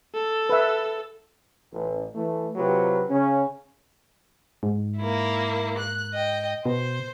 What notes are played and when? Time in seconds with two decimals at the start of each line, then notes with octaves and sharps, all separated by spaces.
0.14 A4
0.49 B4 E5
1.72 A1
2.15 E3 A3
2.56 C3 F#3 F4 G4 B4
3.09 C#3 C#4
4.63 G#2
4.97 A#3 E4
5.78 F#6
6.13 D#5 G5
6.65 B2 C5